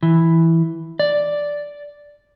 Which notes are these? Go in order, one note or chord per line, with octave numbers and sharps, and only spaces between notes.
E3
D5